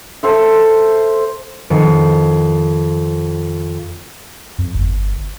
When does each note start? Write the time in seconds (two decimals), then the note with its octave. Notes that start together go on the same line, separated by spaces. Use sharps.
0.23 A4 C5 E5
1.70 F2 D#3 C#7
4.58 F2
4.74 G1